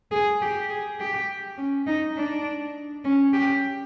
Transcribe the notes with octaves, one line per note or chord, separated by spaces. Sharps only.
G#4
G4
G#4
G4
C#4
D#4
D4
C#4
G4